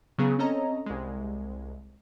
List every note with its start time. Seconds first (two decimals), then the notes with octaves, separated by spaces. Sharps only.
0.18 C#3 F#3 B3 G#4
0.39 C4 C#4 A4 C#5 D#5 A#5
0.86 C2 G#3